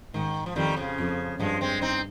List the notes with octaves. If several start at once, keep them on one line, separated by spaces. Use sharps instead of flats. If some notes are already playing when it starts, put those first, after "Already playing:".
G#2 D#3
F3
F2 D#3 G3
C#3 F3
F2
G2 F3 G#3
G#3 C4
C4 D#4